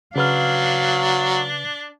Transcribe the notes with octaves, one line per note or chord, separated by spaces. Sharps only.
C#3 F#3 D4 B4 F5 F6